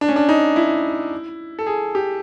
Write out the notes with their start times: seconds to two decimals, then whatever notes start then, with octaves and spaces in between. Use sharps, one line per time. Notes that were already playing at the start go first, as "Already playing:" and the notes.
0.01 D4
0.09 C#4
0.16 D4
0.29 D#4
0.56 E4
1.59 A4
1.67 G#4
1.95 G4